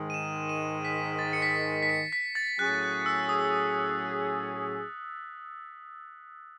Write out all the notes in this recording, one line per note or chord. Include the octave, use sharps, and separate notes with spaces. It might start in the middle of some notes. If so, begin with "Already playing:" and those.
Already playing: G#2 D#3 G#3
D#7
E7
D#7
B6
A6
C#7
B6
B6
C#7
B6
A6
A2 F#3 C#4 G#4 F#6
F#6
E6
D#6